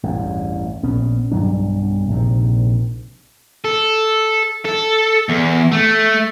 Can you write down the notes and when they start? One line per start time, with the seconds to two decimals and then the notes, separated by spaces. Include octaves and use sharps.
0.03 A1 E2 G2
0.83 A#1 B3 C#4
1.32 B1 G2 F#3 D4
2.08 A#1 G#2 C3
3.65 A4
4.65 A4
5.29 E2
5.72 A3